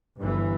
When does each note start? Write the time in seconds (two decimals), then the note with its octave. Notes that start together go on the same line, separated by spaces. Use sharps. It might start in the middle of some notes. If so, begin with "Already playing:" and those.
0.19 G1 G2 E3